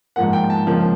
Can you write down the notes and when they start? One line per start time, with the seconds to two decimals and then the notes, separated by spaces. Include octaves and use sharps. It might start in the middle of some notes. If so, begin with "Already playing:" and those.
0.16 G#2 F3 A#3 F#5
0.33 G5
0.50 A5
0.67 C#2 C#3 F3 A#3